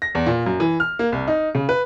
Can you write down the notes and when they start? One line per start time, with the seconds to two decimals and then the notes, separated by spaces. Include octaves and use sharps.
0.02 A#6
0.15 E2
0.26 A#2
0.46 F#2
0.60 E3
0.80 F6
0.99 A#3
1.12 C2
1.28 D#4
1.55 C#3
1.69 B4